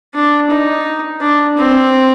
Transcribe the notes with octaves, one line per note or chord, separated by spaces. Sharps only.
D4
D#4
D4
C4